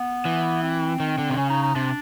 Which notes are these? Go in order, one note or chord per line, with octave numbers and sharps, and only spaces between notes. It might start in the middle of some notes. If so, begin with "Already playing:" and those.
Already playing: B3
E3
C4
D#3
D3
C3
C#3 C#4
D#4
D#4
C3 D4